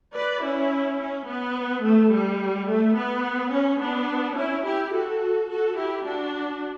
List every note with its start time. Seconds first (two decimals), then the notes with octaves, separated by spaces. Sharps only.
0.15 B4 D5
0.44 C#4 E4
1.01 C#4
1.28 B3
1.84 A3
2.13 G3
2.69 A3
2.96 B3
3.53 C#4
3.81 B3 D4
4.37 C#4 E4
4.65 E4 G4
4.93 F#4 A4
5.50 F#4 A4
5.78 E4 G4
6.06 D4 F#4